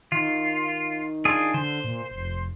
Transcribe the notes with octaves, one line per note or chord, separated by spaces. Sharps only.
D#3 F4
D4 F4 G#4
D3 C5
A#2
F1